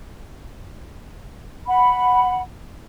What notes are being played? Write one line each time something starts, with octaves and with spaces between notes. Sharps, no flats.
F#5 B5